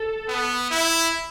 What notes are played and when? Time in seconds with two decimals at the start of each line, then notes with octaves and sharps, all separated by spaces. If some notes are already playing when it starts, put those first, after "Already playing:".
Already playing: A4
0.29 B3
0.71 E4